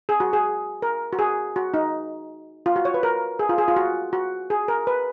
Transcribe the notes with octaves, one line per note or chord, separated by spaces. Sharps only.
G#4
F#4
G#4
A#4
F#4
G#4
F#4
D#4
F4
F#4
C#5
B4
A#4
G#4
F4
G#4
F4
F#4
F#4
G#4
A#4
B4